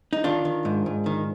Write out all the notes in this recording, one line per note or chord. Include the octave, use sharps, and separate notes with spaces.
D#4
D#3 D4 F4
D#3
G#2
G#2
D#3